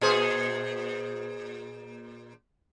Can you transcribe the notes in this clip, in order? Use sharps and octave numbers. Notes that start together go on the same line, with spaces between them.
A#2 G#4 C5